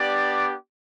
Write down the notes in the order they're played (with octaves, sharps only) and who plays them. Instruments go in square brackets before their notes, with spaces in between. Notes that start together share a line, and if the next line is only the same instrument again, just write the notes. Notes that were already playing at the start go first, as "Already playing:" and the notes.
Already playing: [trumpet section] B3 D4 G4 D5